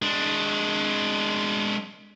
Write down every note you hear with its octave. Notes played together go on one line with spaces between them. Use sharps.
G#3 D4